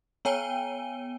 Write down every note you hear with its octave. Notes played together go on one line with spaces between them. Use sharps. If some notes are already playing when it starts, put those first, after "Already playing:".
B3 C#5 G5 G#5 D#7 G7